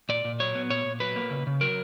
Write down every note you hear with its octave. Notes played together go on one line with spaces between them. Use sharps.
A#2 D5
A#2
F#3 C#5
B3
A#2 C#5
A#2
F#3 B4
A#3
C#3
C#3
F#3 A#4